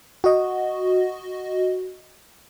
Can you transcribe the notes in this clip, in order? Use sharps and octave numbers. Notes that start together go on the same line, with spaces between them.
F#4 D#5